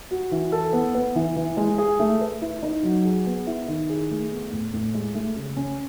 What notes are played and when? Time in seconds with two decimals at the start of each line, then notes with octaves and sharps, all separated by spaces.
0.11 F#4
0.31 E3
0.52 A4
0.73 B3
0.95 B3
1.15 E3
1.36 E3
1.57 G#3
1.78 G#4
1.99 A3
2.21 B4
2.41 E4
2.63 D#4
2.83 F#3
3.05 G#4
3.26 B3
3.47 E4
3.68 D#3
3.89 G#4
4.10 A3
4.31 B3
4.52 A2
4.73 A2
4.94 G#3
5.15 A3
5.36 C#3
5.57 C#4